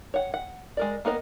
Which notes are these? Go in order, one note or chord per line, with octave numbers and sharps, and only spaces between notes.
C#5 F#5
F#5
G#3 A#4 D5
A#3 B3 A#4 D5 D#5